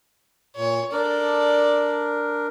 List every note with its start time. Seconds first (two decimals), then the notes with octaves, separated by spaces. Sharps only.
0.56 A#2 C#5
0.92 D4 A4 A#4 D5